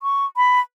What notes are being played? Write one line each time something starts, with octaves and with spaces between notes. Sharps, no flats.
C#6
B5